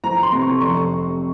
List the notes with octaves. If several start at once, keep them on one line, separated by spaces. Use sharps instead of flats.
F3 A#5
C6
C3
C#6
F1 C#6